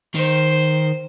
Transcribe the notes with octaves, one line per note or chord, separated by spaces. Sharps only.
D#3 C5